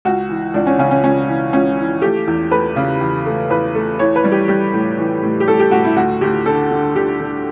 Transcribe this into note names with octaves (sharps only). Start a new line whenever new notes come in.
C#2 F#4
E3
C#2 D4
C#4
C#3 C#4
C#4
C#2 C#4
E3
C#2 C#4
E3
A3 G4
E2
A3 B4
C#3
E2
A3
E2 B4
A3
E3 C#5
B4
G3
G4
G3 G4
A2
E3
A2
G4
A2 A4
G4
A2 F#4
E4
D2 F#4
D2 G4
D3 A4
D3
D3 G4
D3